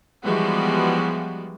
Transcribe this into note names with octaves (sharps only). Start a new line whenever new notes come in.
E3 F3 G3 G#3 B3 F#4